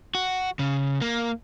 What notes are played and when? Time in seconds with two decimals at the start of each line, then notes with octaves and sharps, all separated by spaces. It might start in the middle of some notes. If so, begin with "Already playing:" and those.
0.15 F#4
0.59 C#3
1.01 A#3